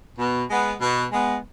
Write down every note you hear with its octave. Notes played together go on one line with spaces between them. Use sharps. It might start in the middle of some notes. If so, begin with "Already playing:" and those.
B2
G#3 B3
B2
G#3 B3